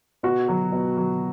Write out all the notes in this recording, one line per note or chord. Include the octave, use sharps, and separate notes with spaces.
B2 F#4
F#3
B2
F#3